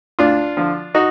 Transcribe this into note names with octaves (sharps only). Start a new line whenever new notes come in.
D2 D4 F4
D3 F3
D#4 F#4